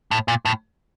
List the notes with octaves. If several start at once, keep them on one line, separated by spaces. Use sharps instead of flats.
A2
A#2
A2